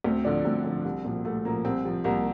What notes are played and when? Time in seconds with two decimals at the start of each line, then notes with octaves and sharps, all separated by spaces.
0.04 D2 C4
0.25 D3 F3 D4
0.45 D2 C4
0.64 D3 F3
0.85 C2
1.04 A#2 F3
1.25 C2 A3
1.45 A#2 F3 A#3
1.65 C2 C4
1.85 C3 F3
2.04 C2 A#3